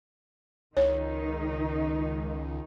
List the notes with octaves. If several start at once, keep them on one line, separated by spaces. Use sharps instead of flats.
C#2 D#3 D#4 C#5